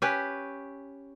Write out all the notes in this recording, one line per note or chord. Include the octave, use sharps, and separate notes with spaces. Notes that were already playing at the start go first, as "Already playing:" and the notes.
C#4 G4 B4